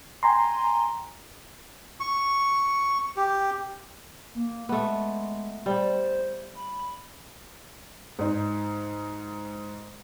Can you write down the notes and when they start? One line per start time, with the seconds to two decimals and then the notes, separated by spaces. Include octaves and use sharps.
0.23 G5 G#5 A#5 C6
2.00 C#6
3.16 G4
4.35 A#3
4.69 G#3 A3 B3
5.66 G3 C5
6.55 B5
8.19 G#2 D#4